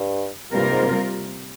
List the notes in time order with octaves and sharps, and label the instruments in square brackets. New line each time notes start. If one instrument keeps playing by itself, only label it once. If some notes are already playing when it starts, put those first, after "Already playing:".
Already playing: [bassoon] G2
[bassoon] G2 [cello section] C3 G3 A#3 F4 A#4
[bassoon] G#2